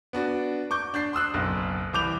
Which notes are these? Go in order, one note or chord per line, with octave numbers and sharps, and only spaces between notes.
B3 D4 F#4
C#6 D6 G6
D4 G6 C7
C6 D#6 E6 F#6
F#1 B1
C2 E3 D6 G6 F7